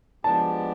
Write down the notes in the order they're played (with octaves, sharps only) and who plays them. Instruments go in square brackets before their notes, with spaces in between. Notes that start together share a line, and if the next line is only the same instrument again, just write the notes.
[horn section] F3 G#3 B3 D4 G4 [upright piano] A5